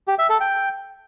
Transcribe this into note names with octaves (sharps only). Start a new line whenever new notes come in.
G4
E5
A4
G5